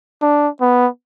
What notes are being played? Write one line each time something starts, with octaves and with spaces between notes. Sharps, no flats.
D4
B3